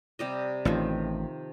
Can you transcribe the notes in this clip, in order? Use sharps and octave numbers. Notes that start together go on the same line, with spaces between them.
C3 G3 D#5
A1 D#3 F3 C4